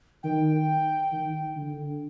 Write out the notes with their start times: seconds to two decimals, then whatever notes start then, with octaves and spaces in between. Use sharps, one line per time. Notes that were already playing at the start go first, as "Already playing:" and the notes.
0.23 D#3 G5
1.13 D#3
1.56 D3